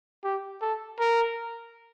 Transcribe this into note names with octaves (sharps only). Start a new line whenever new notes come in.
G4
A4
A#4